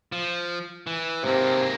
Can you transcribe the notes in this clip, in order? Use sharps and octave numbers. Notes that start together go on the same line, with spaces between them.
F3
E3
G#2 C3 A#3